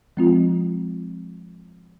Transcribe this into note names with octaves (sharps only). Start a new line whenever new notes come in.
F3 G#3 C4 F4